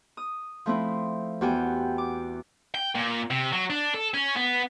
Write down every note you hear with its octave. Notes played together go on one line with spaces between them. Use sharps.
D#6
F3 A3 C4 E4
E2 F#4 G4 G5 G#5
D6
G5
A#2
C3
F#3
D4
A4
C#4
B3